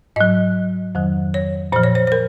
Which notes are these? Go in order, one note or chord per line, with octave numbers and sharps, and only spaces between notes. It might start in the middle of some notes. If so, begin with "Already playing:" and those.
G#2 F#3 D#5
F2 D#3 F#3
C#5
A#2 F3 C5
C#5
C5
C5
A#4